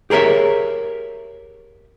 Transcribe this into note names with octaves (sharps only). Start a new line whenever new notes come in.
G4 G#4 A#4 C#5 E5